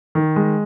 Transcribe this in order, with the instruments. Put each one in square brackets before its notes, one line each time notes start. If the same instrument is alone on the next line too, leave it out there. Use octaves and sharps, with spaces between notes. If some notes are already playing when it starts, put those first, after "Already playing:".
[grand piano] D#3
G#3